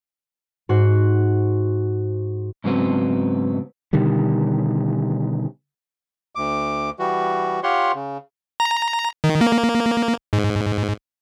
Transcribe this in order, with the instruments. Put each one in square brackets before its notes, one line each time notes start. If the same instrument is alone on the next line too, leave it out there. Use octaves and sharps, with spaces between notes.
[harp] G#2 F#4 C5
[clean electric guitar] G#2 C#3 F#3 A3 B3 C4
[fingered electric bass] B2 D3 D#3 G3
[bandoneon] D2 D6
E3 G3 F#4
F4 G4 C#5 F#5 C6
C#3
[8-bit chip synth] A#5
D#3
A#3
G#2